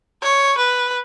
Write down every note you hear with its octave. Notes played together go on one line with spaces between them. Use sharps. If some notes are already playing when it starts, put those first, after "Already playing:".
C#5
B4